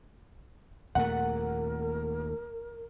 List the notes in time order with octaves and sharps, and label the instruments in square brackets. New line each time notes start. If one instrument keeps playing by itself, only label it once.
[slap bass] D#2 A#2 A3 [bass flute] A#4 [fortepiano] F#5